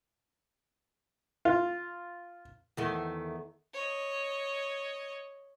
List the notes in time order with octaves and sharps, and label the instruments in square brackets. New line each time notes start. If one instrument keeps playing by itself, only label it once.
[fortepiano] F4
[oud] E2 D#3 A3
[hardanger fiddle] C#5 D#5